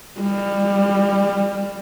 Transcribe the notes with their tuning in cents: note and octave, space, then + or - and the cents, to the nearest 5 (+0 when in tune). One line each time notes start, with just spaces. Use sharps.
G3 +25